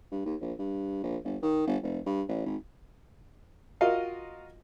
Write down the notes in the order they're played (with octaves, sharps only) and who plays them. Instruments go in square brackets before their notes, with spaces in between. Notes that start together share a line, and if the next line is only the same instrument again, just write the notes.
[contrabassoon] G2
D#2
A#1
G2
A#1
G1
D#3
G1
F1
G2
A1
G#1
[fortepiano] F4 F#4 A#4 D#5 F5